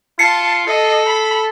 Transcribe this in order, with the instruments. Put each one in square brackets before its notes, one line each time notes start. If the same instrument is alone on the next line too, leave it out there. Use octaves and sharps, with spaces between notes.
[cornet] F4 [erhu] A5 [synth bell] C7 C#7
[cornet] A4 [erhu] D#5
[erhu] B5